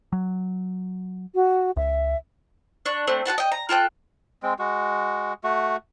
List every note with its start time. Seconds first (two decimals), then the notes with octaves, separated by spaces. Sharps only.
0.13 F#3
1.35 F#4
1.77 C#2 E5
2.85 D4 C#6
3.07 A3 C4 D4
3.25 F#4 C5 F#5 A5
3.38 D#5 G5
3.51 A#5
3.69 F4 A4 G5 F#6
4.43 G#3 C4
4.59 G#3 F#4
5.44 A3 F#4